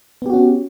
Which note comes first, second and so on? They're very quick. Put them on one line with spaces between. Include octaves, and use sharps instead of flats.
B3 G4 F#4 C#4